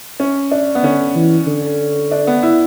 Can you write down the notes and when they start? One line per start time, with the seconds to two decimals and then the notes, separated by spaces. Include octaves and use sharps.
0.20 C#4
0.51 D4
0.75 B3
0.83 D3 C#4
1.15 E3
1.47 D3
2.11 D4
2.27 B3
2.43 E4